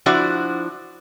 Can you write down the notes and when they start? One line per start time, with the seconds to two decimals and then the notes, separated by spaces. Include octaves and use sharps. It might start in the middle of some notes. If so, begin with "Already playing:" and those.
0.06 F3 D4 E4 F#4 C5 D5